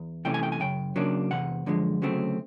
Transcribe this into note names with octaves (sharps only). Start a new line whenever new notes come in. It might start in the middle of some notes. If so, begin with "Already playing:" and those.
Already playing: E2
C2 C3 E3 A3 C#4 G5
G#5
G5
G#5
F#2 C#3 G5
C#3 F#3 A#3 D4
E2 C3 F#5
F#2 D3 F3 G#3
D2 C#3 F#3 A3 C4